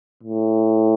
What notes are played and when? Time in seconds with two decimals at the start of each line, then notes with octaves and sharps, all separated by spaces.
0.23 A2